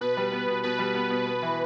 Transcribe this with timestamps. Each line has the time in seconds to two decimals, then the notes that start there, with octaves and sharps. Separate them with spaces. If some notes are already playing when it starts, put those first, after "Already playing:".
0.01 B2 B4
0.17 G3
0.32 B3
0.48 B2
0.63 B2 B4
0.79 G3
0.95 B3
1.10 B2
1.26 B3
1.42 E3